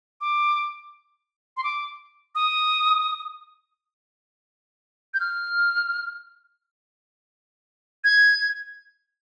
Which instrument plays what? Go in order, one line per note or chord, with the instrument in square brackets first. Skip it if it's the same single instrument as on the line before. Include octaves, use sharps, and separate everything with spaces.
[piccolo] D6
C6
D6
D#6
G6
F6
G#6